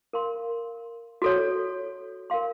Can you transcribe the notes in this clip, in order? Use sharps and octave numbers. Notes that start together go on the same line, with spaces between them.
A#4 F5 C6
F#4 A4 C#5
A#4 F5 C6